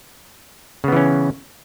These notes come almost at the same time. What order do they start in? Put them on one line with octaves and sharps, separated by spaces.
C#3 B3 E3 C#4